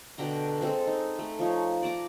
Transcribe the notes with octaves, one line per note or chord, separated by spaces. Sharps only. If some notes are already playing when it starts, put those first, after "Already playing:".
B2 D3 G5 A#5
G#3 C4 A4
D#4
A3
F3 D#4 C#5
D5 A5 A#5 D6